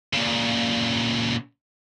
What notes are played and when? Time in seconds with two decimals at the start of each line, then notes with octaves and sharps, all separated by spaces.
0.14 A#2 C#3